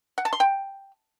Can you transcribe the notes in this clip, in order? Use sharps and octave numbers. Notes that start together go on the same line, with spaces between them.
F#5
A5
C6
G5